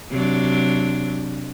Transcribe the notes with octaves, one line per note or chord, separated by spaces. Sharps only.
C3 F#3 D4